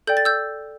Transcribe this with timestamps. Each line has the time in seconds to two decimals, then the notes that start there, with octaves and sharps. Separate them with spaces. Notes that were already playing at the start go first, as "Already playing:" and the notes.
0.07 A4 D5 G5 G6
0.17 A6
0.25 E6 G6